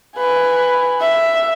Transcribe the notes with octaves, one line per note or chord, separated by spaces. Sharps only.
B4 G#5
E5